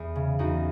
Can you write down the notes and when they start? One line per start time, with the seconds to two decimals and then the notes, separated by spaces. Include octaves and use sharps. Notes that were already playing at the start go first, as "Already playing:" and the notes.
Already playing: E2 G#4
0.15 C#3
0.39 E2 D#4 F#4